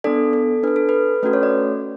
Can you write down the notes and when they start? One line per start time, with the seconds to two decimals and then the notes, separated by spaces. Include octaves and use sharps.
0.04 B3 D4 A4 D5
0.33 A4
0.63 D4 A4 B4
0.76 A4
0.89 B4
1.23 A3 C#4 F#4 A4 B4
1.33 C#5
1.43 D5